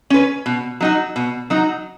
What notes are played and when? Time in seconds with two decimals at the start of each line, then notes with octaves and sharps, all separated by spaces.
0.10 C#4 B4
0.46 B2
0.80 F#3 D#4 F#4
1.16 B2
1.50 F#3 D#4 F#4